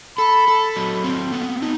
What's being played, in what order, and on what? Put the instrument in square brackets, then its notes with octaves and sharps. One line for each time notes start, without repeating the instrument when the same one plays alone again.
[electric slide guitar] A4 [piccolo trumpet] B5
[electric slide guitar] A4
F#3
C4
B3
D#4